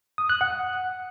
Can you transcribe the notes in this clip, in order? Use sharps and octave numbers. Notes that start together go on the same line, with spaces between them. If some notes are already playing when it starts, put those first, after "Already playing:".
D#6
F#6
F#5